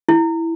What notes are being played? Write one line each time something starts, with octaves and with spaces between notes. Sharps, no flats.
E4